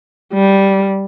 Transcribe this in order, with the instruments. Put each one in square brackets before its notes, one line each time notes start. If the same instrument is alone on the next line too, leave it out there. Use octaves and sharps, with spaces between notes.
[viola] G3